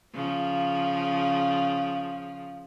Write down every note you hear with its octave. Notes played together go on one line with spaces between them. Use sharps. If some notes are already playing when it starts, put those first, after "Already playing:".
C#3 F3